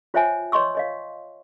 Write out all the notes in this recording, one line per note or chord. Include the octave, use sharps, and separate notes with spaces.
F4 C5 C#5 E5 G5 G#5
B4 C#5 D#5 C6 C#6 E6
C#5 D#5 F5